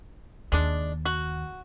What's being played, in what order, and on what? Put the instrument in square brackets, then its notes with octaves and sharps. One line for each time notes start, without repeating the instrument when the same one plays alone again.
[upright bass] D#2 [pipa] G#3 D4
[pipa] F#4